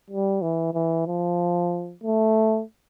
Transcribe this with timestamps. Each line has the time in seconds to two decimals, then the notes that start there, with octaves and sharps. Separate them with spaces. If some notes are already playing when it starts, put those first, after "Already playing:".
0.10 G3
0.42 E3
0.74 E3
1.07 F3
2.04 A3